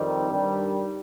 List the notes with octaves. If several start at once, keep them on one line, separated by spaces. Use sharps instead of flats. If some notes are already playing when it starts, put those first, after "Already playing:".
Already playing: F2 D#3 G3 C4 D#4
G2 D#3 G3